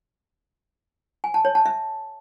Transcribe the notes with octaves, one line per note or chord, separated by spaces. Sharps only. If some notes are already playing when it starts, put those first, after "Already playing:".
G#5
A5
C#5
A5
E5